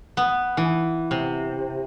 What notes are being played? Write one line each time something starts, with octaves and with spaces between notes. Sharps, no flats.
B3
E3
C3